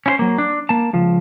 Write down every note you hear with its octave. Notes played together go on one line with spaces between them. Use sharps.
C#4 E4 C5
F#3 A#3
D4
A#3 A5
C#2 F3